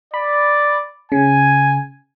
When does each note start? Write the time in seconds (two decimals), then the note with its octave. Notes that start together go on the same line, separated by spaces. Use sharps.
0.14 D5 B5
1.12 C#3 G#5